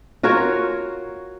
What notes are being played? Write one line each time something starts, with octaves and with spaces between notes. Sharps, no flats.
F4 F#4 A#4 C#5